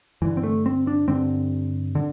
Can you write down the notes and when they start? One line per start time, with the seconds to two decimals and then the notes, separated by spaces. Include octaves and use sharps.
0.22 G2 D3 E3
0.37 C4
0.43 A3
0.66 C4
0.87 D4
1.08 G2 D3 C4
1.95 D3